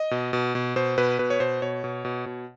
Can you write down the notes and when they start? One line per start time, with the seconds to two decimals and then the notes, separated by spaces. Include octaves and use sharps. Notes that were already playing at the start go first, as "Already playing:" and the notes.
Already playing: D#5
0.11 B2
0.33 B2
0.55 B2
0.76 B2 C5
0.98 B2 B4
1.19 B2 B4
1.30 C#5
1.40 B2 C5
1.62 B2 C#5
1.84 B2
2.05 B2
2.26 B2